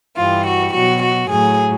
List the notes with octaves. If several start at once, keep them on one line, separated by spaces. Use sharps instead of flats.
G2 E3 G3 F4
F#4
B2 F#3 F#4
F#4
A2 F#3 G#4